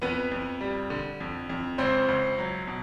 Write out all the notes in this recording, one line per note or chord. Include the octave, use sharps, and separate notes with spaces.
F2 B3 B4
F2
G3
D3
F2
F2
C#2 C4 C5
C#2
F#3
B2